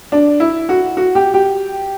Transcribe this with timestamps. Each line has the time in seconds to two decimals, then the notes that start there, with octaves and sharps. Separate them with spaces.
0.12 D4
0.40 E4
0.69 F#4
0.97 F#4
1.15 G4
1.34 G4